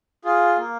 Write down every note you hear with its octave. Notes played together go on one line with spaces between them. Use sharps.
F4 G#4
A#3